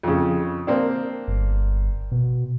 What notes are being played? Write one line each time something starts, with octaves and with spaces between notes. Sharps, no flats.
F2 C#3
A#3 C4 D4
G1
B2